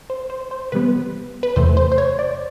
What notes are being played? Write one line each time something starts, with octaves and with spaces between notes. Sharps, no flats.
C5
C5
C5
C3 E3 G3 B3 B4
B4
E2 C3 E3 A3 C5
C5
C5
C#5
D5